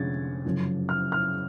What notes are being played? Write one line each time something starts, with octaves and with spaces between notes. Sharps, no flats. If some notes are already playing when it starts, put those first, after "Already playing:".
Already playing: F1 F2 D3 G#3 C#4 G#6 A6
F#1 F#2 F3
F6
F6